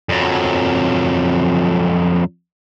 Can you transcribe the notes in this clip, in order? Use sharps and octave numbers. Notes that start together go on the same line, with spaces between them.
F2 F#3